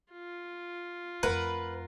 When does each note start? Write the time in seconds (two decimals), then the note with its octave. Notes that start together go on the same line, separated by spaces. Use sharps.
0.12 F4
1.23 F2 A3 A#4 B4 F#5